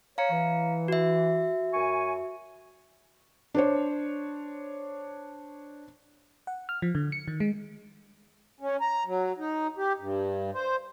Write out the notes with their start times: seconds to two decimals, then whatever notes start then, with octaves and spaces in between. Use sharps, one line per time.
0.18 C#5 F5 A#5 C#7
0.31 E3
0.88 F#4 E5
1.74 F#2 G#5 C#6
3.54 D4 C5 C#5
6.47 F#5
6.69 F6
6.82 F3
6.95 D3
7.12 C#7
7.28 D#3
7.40 G#3
8.60 C#4
8.81 A#5
9.05 F#3
9.38 D#4
9.77 G4
9.99 G2
10.54 C5